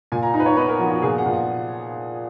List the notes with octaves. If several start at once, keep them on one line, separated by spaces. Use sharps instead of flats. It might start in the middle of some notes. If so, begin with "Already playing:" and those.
A#2 G#5
A#5
D#4 A#5
B4
C#5
B3 B4
A#4
F3 F#4
F#4
A#2 G#4
F#5
A#2
F#5